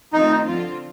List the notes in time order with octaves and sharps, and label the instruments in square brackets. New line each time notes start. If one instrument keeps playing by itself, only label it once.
[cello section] D#3 A3 C4 F4 [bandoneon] D#4
[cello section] D3 F3 C4 F4